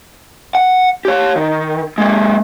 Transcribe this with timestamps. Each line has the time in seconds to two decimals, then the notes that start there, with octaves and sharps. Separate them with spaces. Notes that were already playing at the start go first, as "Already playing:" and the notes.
0.55 F#5
1.05 G4 C#5
1.36 D#3
1.98 G#3 A#3